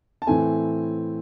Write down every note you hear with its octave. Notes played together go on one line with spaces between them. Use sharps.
A5
A2 E3 A3 C4 G#5